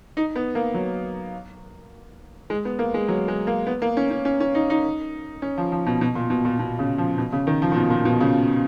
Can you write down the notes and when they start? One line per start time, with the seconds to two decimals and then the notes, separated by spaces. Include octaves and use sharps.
0.17 D#4
0.36 B3
0.55 A#3
0.74 F#3
2.50 G#3
2.65 B3
2.79 A#3
2.94 G#3
3.08 F#3
3.28 G#3
3.47 A#3
3.67 B3
3.82 A#3
3.97 C#4
4.11 C#4
4.25 C#4
4.40 C#4
4.55 D#4
4.70 D#4
5.42 C#4
5.58 F3
5.72 F3
5.86 B2
6.01 B2
6.15 A#2
6.30 B2
6.45 A#2
6.59 B2
6.79 C#3
6.98 F3
7.18 B2
7.33 C#3
7.47 D#3
7.62 F3
7.72 A#2
7.76 B2
7.90 A#2
8.05 B2
8.21 C#3